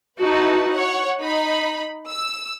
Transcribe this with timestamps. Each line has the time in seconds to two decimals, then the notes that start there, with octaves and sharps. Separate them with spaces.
0.21 D#4 E4 F#4 B4 A5
0.71 C#5 F#5
1.20 D#4 B5
2.08 E6